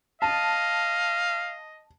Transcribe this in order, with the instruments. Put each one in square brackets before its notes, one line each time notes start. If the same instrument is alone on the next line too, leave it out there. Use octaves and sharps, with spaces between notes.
[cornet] D#5 [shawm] F5 [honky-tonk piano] A5